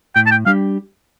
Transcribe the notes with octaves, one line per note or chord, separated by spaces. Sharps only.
A2 G5
A5
G5
G3 D4 G4 F5